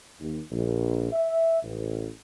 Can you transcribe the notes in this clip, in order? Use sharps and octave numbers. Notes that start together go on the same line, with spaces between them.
D#2
A#1
E5
A1